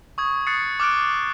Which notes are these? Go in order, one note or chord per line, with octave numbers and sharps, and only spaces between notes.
C#6 D#6 G#6
D#6 F#6 A6 C7 C#7
D6 F6 F#6 D7